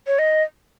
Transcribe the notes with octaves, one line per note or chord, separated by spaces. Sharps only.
C#5
D#5